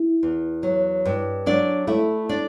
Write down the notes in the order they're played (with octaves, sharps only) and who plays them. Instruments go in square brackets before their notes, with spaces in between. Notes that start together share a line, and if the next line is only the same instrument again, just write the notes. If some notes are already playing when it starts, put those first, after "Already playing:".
Already playing: [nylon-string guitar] E4
E2
F#3
G2
F#3 D4 D5
A3 E4 E5
D4 D5